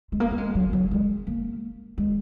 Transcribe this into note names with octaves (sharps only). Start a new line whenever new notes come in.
G#3
A#3
A#3
G#3
F#3
F#3
G#3
A#3
G#3